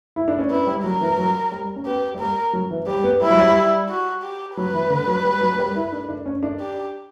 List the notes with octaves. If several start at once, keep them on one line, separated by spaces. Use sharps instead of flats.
E4
D4
C#4
B3 E4
G3
F#3 A#4
E3
F#3
G3
C#4
B3 G4
G3
A#3 A#4
F#3
E3
G3 G4
B3
G3 E4
F#3
G3
F#4
G4
F#3 B4
E3
D3
F#3
G3
F#3
A#3
G3
E4
D4
D4
C#4
D4
G4